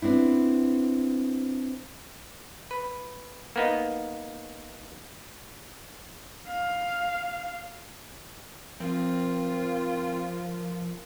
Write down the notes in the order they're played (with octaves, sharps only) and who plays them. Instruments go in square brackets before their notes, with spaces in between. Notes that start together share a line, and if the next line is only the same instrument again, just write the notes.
[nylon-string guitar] B3 C4 D4 E4
[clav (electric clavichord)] B4
A#3 B3 D#4
[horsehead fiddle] F5
[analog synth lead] F3 [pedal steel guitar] C4 [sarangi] F4 [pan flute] A#4